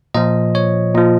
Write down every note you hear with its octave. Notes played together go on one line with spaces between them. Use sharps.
A#2 F3 D#5
C#5
A#2 F3 D#5